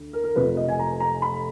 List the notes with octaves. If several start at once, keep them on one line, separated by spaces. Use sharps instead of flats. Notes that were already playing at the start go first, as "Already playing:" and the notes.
Already playing: D2
A#4
A#4
F1 F2 F3 B4
D#5
G#5
A#5
A#5
B5